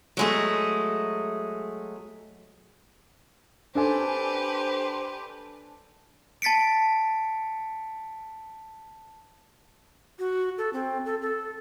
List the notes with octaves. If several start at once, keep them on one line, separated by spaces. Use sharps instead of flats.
F#3 G#3 A3
D4 G4 A4 B4 C5 G#5
A5 A6 B6 C#7 D7
F#4
A4
C4
A4
A4